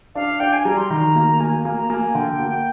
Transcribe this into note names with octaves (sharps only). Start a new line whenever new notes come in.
D4 F5
D4 G5
G#5
G3 A#5
C6
D#3 A#5
A#3
A#3 G#5
G#5
A#3
A#5
A#3 G#5
D3 G5
A#3